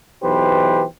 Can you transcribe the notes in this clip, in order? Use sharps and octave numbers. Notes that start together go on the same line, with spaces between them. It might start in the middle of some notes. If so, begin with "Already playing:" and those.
B1 E3 G4 B4 C5